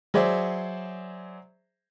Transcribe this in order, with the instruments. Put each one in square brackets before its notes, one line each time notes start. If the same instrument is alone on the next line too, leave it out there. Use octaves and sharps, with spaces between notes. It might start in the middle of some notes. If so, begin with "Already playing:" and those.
[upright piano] F#3 G#4 C5 D5 E5